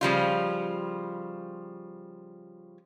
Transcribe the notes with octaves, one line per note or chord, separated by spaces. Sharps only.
C#3 F3 G3 F4